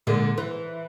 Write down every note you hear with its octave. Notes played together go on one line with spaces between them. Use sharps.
A#2 D3 G#3
E3